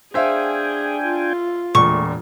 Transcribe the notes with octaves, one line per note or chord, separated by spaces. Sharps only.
D4 G#4 C5 E5 F5 G5 G#5
F4
E1 A#2 A3 C#6